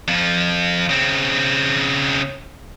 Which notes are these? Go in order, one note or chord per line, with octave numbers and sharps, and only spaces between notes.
F2 F3
C#3 C4